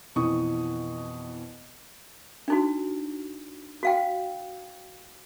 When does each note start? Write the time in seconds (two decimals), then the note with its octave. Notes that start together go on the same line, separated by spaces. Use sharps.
0.15 F2 B2 E3 C#6 D#6
2.48 D4 D#4 F#4
3.83 F#4 F5 G5